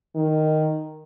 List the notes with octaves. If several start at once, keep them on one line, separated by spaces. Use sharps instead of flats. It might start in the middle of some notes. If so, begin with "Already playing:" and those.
D#3